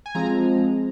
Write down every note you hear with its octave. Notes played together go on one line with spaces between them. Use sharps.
G#5
F3 G#3 C4 A#5